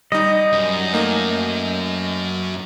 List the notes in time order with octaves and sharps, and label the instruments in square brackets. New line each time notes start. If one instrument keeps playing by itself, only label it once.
[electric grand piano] G3 D#4 [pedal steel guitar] D#5
[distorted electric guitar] F#2
[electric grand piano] A3 A#3 D#4